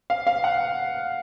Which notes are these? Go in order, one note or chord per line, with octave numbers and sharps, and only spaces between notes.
F5
F5
F#5